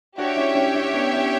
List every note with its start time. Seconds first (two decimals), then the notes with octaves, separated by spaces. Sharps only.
0.18 D4 F#4 G4 C#5 E5 G5
0.36 C#4 E4
0.49 D4
0.55 C#4 E4
0.75 C#4 E4
0.94 B3 D4
1.13 C#4 E4